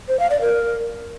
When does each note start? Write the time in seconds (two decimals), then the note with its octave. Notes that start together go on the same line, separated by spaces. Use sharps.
0.09 C5
0.20 F5
0.30 D5
0.41 A#4